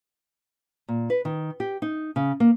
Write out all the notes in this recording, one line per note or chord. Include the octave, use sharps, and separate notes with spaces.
A#2
B4
D#3
G4
D#4
C#3
A#3